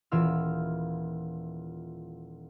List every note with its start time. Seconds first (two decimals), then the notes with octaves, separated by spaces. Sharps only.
0.12 D#1 E3 F4 E6 F6